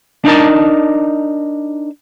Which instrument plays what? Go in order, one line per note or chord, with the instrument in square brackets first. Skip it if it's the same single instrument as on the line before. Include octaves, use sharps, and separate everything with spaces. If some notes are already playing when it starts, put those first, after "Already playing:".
[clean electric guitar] D4 D#4 A#4 A5